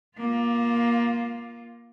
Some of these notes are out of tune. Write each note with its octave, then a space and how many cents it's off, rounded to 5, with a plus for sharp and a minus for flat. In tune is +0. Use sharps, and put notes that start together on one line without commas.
A#3 +20 F4 +0